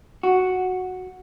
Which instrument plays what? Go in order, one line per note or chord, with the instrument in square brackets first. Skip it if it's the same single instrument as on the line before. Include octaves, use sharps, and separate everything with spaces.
[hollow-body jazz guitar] F#4